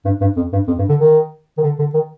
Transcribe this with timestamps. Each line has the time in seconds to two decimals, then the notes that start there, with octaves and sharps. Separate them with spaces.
0.05 G2
0.21 G2
0.36 F2
0.53 G2
0.67 F2
0.79 G2
0.89 D3
1.00 D#3
1.58 D#3
1.63 D3
1.79 D3
1.94 D#3